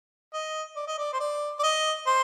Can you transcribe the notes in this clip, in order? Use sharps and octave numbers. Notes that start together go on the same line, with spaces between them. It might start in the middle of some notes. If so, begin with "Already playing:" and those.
D#5
D5
D#5
D5
C5
D5
D5
D#5
C5